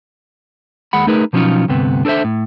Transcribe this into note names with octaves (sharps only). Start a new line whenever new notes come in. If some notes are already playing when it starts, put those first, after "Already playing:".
D#2 G#3 F#5 B5
A3 D#4 G#4 A#4 B4
B2 F3 F#3 C#4 D#4 F4
D2 G2 C3 B3
D4 A4 A#4 C5 E5
A2